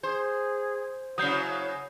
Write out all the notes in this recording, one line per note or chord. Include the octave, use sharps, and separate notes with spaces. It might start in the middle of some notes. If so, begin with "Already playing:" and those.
G#4 C5
C#3 F#3 E4 D#6 G6 C7